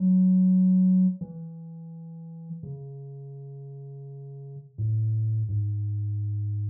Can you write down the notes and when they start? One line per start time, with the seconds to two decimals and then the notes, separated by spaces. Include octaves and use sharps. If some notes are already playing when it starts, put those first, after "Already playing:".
Already playing: F#3
1.21 E3
2.63 C#3
4.78 A2
5.49 G#2